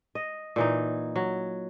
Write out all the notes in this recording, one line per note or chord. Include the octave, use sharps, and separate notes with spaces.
D#5
A#2 E3 D#4
F#3